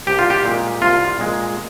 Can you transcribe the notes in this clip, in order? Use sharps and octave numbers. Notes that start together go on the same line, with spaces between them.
C2 G4
F4
G4
A#2 G#3
C2 F4
A#2 G#3